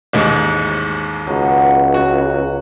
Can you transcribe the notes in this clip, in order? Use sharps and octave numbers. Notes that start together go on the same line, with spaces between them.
A1 D#2 G#2
C#2 F#3 B3
F#4